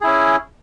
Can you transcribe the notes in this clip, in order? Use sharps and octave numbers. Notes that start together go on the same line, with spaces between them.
C#4 E4 G#4